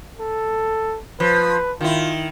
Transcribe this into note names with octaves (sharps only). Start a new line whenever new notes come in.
A4
F3 B4
D#3 E4 F4